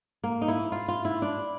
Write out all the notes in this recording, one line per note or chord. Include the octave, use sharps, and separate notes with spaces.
A#3
D#4
E4
F4
F4
E4
D4